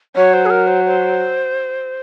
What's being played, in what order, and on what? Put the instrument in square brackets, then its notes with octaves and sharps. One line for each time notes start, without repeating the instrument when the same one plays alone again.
[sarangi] F#3 [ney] C#5
[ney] C5
G#4
A#4
C5
C5